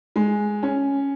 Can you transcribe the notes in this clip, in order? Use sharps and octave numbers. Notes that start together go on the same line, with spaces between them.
G#3
C#4